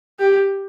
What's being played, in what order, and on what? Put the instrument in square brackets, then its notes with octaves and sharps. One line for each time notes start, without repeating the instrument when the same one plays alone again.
[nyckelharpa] G4